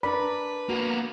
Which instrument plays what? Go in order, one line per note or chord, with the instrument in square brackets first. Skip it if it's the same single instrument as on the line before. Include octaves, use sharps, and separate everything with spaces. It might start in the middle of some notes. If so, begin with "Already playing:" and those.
[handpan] D4 A#4 D5 [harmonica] B4 [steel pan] B5
[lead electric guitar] A#3 B3 [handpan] F#4